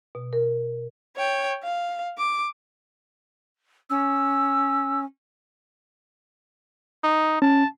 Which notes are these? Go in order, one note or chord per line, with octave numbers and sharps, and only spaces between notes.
B2
A#4
C#5 G5
F5
D6
C#4 E6
D#4
C#4 A5